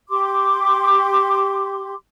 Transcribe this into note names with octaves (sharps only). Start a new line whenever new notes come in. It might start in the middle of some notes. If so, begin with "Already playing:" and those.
G4 C6 D6